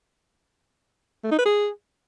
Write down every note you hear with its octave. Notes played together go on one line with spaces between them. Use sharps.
A3
D#4
B4
G#4